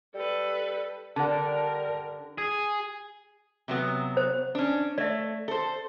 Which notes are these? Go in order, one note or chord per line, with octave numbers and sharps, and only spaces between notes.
G3 A4 B4
D3 G3 A#4 F#5 A5
G#4
C3 F#3 B3
C5
C#4 D4
A3 D5 E5
A4 C5